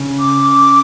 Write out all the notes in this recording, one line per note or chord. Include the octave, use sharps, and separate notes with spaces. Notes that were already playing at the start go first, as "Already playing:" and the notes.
Already playing: C#3
D6